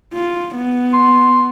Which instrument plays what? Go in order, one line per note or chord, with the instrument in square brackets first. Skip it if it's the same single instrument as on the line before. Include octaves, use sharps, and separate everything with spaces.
[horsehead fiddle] F4
B3
[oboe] C6